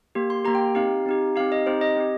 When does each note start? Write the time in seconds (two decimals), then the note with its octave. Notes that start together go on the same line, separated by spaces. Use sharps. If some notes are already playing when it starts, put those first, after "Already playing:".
0.15 A#3 G4
0.30 C6
0.45 A#3 G4 A#5
0.55 G5
0.75 C4 D#4 G4 F5
1.06 C4 D#4 G4
1.36 C4 D#4 G4 F5
1.52 D#5
1.66 C4 D#4 G4 C5
1.81 D#5
1.96 C4 G4